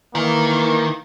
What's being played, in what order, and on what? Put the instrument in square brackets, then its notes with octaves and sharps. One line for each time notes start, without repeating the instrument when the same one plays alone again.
[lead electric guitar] D#3 [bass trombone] E3 [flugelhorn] A#3